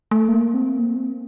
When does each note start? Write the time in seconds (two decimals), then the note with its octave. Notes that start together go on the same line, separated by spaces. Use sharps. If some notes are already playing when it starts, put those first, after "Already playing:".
0.11 A3
0.28 A#3
0.54 C4
0.79 A#3
0.96 C4